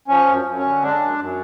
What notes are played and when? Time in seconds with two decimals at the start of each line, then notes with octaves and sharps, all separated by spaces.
0.08 F3 C#4
0.27 F#2
0.45 F#2
0.58 C#4
0.63 D3
0.82 G#3 D4
1.00 F#2
1.18 F#2